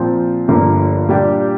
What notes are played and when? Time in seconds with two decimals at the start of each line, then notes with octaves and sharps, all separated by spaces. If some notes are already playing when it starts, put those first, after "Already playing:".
Already playing: A#2 F3 C4
0.48 G1 G2 D3 F3 A#3
1.09 A#2 G3 D4 G4